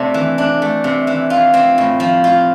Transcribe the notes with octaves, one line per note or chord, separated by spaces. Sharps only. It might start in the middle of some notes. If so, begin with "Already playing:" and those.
Already playing: C3 A3 D4
E3
D4
A3
C3
E3
F4
C4
A2
F3
F4